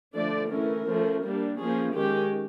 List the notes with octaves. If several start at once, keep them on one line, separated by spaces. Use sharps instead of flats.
D3 F3 A3 D4 D5
E3 A3 C#4 A#4
F3 A3 C#4
G3 A#3 D4
F3 A#3 C#4 G#4
D#3 G#3 C#4 G4